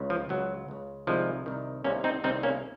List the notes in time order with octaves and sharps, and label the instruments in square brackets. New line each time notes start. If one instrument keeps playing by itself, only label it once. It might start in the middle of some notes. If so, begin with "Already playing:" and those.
Already playing: [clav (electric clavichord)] C#2 C#3
F3
C#2 C#3 F#3
C#2 C#3
C2 C3 D#3 F3 G#3
C2 C3 D#3
C2 C3 D#3 A#3 C#4
C4 D#4
C2 C3 D#3 C4 D#4
A#3 C#4